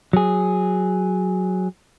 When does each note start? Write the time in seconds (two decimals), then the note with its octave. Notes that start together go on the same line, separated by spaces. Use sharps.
0.13 F#3 G#4